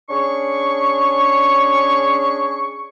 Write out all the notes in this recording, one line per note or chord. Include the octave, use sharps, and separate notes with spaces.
C#4 D4 G#4 C#6